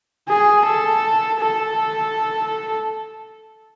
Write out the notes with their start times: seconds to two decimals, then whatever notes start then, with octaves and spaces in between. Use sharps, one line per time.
0.29 G#4
0.65 A4
1.40 A4